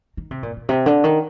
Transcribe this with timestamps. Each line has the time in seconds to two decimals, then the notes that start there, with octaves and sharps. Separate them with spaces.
0.17 D#3
0.31 C3
0.43 A#2
0.57 A#2
0.69 C3
0.86 D3
1.04 D#3